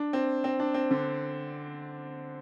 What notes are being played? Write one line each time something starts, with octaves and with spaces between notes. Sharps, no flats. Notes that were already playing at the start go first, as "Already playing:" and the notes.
Already playing: D4
C4
C4
D4
C4
D3